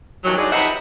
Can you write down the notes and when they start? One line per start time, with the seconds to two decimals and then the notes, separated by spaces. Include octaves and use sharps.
0.24 G2 A#2 D#3 E3 F#3
0.37 F#3 G#3 D4 D#4 G#4 D5
0.51 C3 F3 D#4 B4 E5 F#5